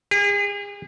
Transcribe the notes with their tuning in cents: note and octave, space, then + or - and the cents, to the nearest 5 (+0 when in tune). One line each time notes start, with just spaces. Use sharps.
G#4 -40